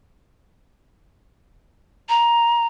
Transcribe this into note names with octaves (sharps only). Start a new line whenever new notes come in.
A#5